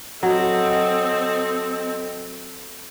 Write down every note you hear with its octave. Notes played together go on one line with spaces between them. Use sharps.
F#3 C4 A4 D#5